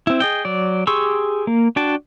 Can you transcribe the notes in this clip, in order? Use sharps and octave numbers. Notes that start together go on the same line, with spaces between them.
C4 E4
G#4 D#5 G5
F#3 D5
G4 G#4 C6 C#6 E6
A#3
D4 F#4 G5 A5